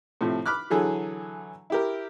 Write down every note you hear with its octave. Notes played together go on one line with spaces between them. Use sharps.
A2 C3 F3
B5 D6 F6 F#6
D3 E3 F#3 G#4 A4
E4 G4 A#4